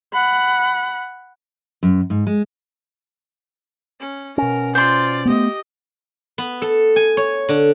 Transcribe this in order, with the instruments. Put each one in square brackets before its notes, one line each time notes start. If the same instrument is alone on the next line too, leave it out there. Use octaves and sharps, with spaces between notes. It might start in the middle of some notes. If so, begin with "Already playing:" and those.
[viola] F#5 B5
[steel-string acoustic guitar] F#2
G#2
G#3
[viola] C#4
[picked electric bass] B2 C#4 [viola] A#4
[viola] F4 D5 [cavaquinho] C5 C6
[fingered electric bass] A3 B3 [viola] G4 D#5
[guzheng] B3
A4
G#5
C#5
D3